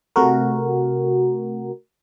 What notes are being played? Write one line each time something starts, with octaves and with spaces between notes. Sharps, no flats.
C3 A3 F#4 A#4